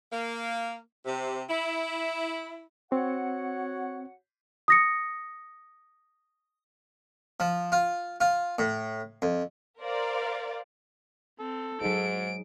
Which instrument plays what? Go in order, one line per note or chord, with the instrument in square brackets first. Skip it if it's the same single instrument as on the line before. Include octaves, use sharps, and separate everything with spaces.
[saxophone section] A#3
C3
E4
[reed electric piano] C4 [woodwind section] F#4 C#5 F#5
[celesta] D#6 A#6 C#7
[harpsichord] F3
F4
F4
A2
F2
[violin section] A#4 C5 D5 F5
[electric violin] C4 [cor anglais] A4
[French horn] G#2 [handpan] F#3 D#4 G#4 [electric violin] D7